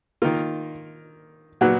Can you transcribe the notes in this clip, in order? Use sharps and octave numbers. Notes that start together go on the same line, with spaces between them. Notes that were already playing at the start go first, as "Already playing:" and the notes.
D#3 A#3 F4
A#2 F#3 B3 F#4